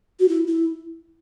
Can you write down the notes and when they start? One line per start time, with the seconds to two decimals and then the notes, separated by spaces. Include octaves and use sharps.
0.20 F#4
0.28 E4
0.47 E4